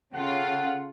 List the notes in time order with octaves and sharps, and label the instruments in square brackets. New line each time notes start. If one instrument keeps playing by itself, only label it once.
[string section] C#3 F4 [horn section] G4 A4 F#5